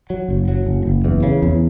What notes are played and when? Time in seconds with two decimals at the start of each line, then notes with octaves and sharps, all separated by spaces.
0.10 F#3
0.29 F#1
0.48 F#3
0.66 F#1
0.86 F#1
1.05 E2
1.23 C#3
1.42 E2